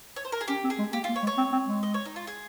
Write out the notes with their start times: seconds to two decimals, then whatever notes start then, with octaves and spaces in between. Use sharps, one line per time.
0.16 C#5
0.25 C5
0.32 A#4
0.41 G#4
0.48 C#4 G4
0.64 C4
0.70 G#4
0.79 G#3
0.93 A#3 G4
1.04 A#3 F4
1.16 C#5
1.22 G#3
1.27 C#5
1.37 C4
1.52 C4
1.67 G#3
1.83 D#5
1.94 C#5
2.05 D#4
2.16 F4
2.27 G#4